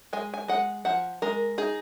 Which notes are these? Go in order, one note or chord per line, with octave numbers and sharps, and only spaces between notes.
G#3 G#5
G#5
G#3 F#5
F3 F#5
G#3 A#4
D#4 G#4